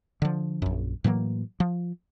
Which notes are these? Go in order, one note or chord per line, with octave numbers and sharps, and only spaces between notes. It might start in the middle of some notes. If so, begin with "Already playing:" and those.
D3 F3
A#1 F#2
A2 E3 F#3 A#3
F3